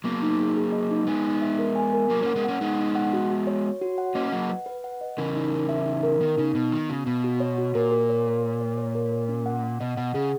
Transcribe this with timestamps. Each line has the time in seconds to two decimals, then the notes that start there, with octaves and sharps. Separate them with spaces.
0.04 F#3 A#3 B3
0.22 D#4
0.39 G#4
0.56 G#4
0.72 D#5
0.91 D#4
1.07 G#3 B3 G#5
1.24 D#4
1.41 E5
1.59 A#4
1.76 G#5
1.93 A#4
2.10 F#3 A#3 A#4
2.23 A#3 C#4 F#5
2.36 G#3 B3
2.44 A#3 C#4 F#5
2.61 G#3 B3 D#4
2.78 D#4
2.95 F#5
3.13 F#4
3.29 F#4
3.47 C#5
3.64 C#5
3.81 F#4
3.98 F#5
4.15 A#3 C#4 D#5
4.32 F#3 A#3 F#5
4.49 B4
4.66 B4
4.84 F#5
5.01 D#5
5.17 C#3 E3 A#4
5.35 D#4
5.52 A#4
5.69 E5
5.86 D#4
6.03 A#4
6.21 D#3 B3
6.37 C#3 D#4
6.55 B2 B3
6.72 D#3 B3
6.90 C#3 F#4
7.06 B2 B3
7.24 F#4
7.40 C#5
7.58 F#4
7.75 A#2 A#4
7.91 A#4
8.09 C#5
8.27 A#4
8.43 A#4
8.61 C#5
8.78 C#5
8.95 A#4
9.12 A#4
9.29 C#4
9.46 F#5
9.64 F#5
9.80 B2 D#5
9.97 B2 F#5
10.14 C#3 G#4